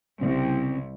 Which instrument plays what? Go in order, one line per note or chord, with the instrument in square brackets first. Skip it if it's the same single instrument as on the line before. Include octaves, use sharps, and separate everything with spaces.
[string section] C2 [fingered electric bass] C#3 C4